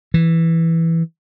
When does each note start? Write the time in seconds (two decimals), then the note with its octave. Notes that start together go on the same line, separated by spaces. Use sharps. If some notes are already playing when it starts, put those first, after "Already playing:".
0.14 E3